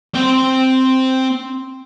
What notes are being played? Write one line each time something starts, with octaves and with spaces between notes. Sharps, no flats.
C4 G5